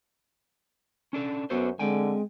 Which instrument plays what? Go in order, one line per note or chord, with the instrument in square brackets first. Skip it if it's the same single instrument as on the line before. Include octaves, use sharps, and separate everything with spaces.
[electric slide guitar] C#4 D4 A4
[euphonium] F#2 [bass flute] B3 [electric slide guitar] F#4 A4 C5
[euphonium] D3 [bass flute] G#3 [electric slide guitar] C4 G5 G#5